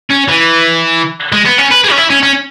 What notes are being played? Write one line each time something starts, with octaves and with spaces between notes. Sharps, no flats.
C#4
E3
G#3
B3
C#4
B4
G#4
C#4
E4
C#4
C#4